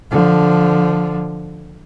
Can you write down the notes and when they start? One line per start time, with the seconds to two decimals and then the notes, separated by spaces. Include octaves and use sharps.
0.11 D3 F3